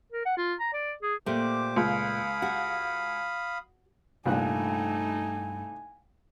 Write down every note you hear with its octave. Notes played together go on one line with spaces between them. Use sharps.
A#4
F#5
F4
A#5
D5
G#4
A#2 A3 G4 C5 D6
C#2 F5 B5 D#6
F#4
C2 G2 A#2 A3 D#4 G#5 F#6